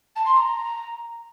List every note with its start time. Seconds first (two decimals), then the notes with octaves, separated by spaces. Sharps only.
0.15 A5
0.25 C6
0.35 A#5